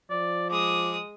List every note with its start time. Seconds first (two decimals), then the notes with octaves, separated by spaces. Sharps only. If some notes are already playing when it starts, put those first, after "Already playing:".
0.10 F3 D5
0.50 G#3 D6 D#6